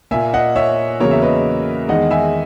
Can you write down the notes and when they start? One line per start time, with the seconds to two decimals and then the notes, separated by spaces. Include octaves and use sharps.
0.11 A#2 A#3 E5 G#5
0.34 D#5 F#5
0.56 C#5 E5
1.00 E2 C#3 F#3 A#3 A#4 C#5
1.11 E5
1.22 B4 D#5
1.88 E2 D#3 G#3 D#5 F#5
2.11 E5 G#5